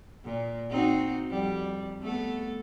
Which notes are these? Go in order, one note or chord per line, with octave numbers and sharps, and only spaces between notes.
A#2
C4 D#4 F#4
F2 G3
A3 B3 A4